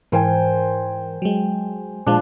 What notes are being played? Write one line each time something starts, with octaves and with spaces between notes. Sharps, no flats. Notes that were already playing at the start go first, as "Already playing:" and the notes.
G#2 E3 A#4 C5 G5 G#5
F#3 G#3
A#2 F3 G#3 D4